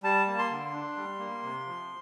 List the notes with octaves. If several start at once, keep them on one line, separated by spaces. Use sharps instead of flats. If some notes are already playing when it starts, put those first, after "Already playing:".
G3 A5
A#3
C6
D3
D4
G3
A#3
C3
F3